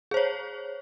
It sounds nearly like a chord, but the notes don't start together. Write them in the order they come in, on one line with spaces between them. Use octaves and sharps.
G#4 C5 C#5